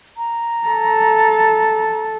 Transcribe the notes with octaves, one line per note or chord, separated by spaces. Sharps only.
A#5
A4